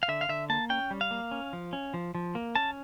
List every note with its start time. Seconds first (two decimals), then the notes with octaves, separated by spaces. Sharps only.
0.03 F5
0.08 D3 E5
0.21 F5
0.29 D3 E5
0.50 A#3 A5
0.70 C#4 G5
0.91 G3
1.01 F5
1.11 A#3
1.31 C#4
1.53 F3
1.73 C#4
1.94 F3
2.15 F3
2.35 A#3
2.55 C#4 A5